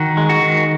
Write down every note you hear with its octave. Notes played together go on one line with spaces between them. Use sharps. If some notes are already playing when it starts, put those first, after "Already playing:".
Already playing: D#3 F#4
G#3
F#4
D#3